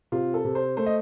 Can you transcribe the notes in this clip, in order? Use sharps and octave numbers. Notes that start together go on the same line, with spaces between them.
C3 F4
A4
C3
C5
A3 C5
D#5